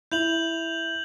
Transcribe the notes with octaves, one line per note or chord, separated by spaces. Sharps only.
E4 G6 F7 F#7